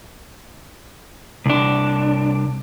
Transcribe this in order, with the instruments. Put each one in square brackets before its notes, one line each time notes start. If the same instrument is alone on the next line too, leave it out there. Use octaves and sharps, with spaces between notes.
[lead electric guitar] C2 D4